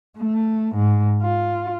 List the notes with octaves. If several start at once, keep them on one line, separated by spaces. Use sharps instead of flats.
A3
G#2
F4